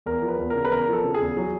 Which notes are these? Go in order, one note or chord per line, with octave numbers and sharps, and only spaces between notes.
E2 A#4
F3
B4
E2
A#4
C#3
B4
E2 A#4
F3 A4
C#3
G#4
E2
F#3